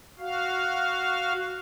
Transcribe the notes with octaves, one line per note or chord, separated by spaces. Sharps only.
F#4 F5